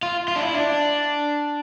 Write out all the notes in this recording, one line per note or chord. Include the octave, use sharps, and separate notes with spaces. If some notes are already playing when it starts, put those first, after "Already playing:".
F4
F4
D4
E4
D4